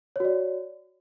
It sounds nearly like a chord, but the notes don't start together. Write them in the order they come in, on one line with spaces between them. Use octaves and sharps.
C#5 F#4 D5